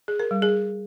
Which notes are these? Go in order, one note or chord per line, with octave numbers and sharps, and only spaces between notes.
G#4
A#4
G3
G#4